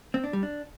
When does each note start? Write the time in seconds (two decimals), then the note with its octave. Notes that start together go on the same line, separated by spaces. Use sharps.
0.14 C4
0.24 D4
0.33 G3
0.43 D4